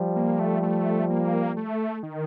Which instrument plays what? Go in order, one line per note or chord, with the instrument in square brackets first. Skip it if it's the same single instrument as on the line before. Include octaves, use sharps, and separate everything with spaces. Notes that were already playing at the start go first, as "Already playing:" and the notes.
Already playing: [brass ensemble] F3 G3
[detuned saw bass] A#3
A3
A3
A#3
A3
D#3